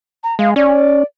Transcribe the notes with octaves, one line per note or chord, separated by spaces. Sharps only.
A#5
G#3 F5
C#4 D5